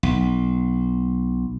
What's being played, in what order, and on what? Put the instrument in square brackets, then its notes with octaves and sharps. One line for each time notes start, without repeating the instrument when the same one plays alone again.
[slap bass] B1